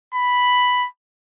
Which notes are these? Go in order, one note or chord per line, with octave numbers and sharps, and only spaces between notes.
B5